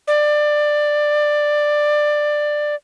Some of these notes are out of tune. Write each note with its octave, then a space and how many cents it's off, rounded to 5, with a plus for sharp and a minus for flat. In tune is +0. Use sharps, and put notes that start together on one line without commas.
D5 +15